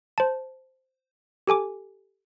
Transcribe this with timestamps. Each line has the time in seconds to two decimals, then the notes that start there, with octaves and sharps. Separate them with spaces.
0.18 C5 A5
1.48 G4 A4 G#5 D6